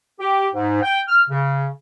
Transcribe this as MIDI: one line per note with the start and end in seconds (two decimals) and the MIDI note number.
0.19 0.47 67
0.53 0.81 44
0.82 1.00 79
1.08 1.22 89
1.29 1.67 49